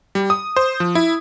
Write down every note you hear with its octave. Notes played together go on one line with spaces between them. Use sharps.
G3
D#6
C5
F3
E4